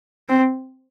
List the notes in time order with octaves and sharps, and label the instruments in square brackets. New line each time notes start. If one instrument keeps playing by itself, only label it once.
[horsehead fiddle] C4